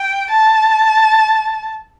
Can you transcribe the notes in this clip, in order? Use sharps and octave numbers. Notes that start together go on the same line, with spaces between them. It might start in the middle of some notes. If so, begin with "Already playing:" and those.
Already playing: G5
A5